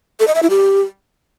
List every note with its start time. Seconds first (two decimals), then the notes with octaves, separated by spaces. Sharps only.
0.20 A4
0.27 D#5
0.35 E5
0.42 E4
0.50 G4